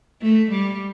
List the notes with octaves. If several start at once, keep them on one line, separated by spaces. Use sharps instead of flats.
A3
G3